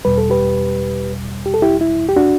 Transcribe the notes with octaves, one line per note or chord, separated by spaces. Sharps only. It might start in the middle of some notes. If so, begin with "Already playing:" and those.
E2 B2 G3 B4
A4
G4 B4
G4
A4
E4 G4
E4
G4
D4 F#4